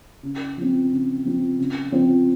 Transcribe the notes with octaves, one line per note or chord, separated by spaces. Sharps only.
C#3
F3 C4
C#3
F3 C4
C#3
F3 C4 F4 C5